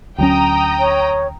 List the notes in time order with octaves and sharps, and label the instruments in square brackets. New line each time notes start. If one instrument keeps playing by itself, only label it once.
[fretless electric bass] D2 F#3 C#4 [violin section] G5 A#5 D#6
[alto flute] C#5